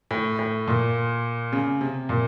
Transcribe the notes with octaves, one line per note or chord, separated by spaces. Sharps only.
A2
A2
A#2
C#3
C3
A#2